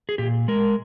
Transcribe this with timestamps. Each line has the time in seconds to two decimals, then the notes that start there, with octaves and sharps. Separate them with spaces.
0.09 G#4
0.18 A#2 G4
0.48 G#3 A#4